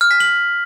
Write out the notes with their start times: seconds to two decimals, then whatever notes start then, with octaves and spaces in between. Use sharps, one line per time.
0.01 F6
0.11 B6
0.20 F#7